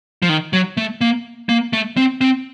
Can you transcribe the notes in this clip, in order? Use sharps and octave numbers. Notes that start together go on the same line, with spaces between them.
F3
D#3
F#3
A3
A#3
A#3
A3
C4
C4